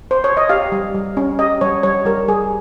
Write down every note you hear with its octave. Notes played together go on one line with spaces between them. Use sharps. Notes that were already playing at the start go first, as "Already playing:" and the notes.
C5
C#5
D#5
G4 F5
G3
G3
C#4
G4 D#5
G3 C#5
G3 C#5
G3 A#4
G3 G#4